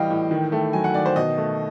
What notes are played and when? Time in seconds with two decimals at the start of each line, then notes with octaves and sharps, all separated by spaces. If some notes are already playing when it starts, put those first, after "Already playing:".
Already playing: A2 E3 G3 D#5 F5 G5
0.10 A2
0.31 D#3
0.52 A3
0.73 F#3 G#5
0.84 F#5
0.94 D#3 D5
1.06 C5
1.16 B2 D#5
1.38 A3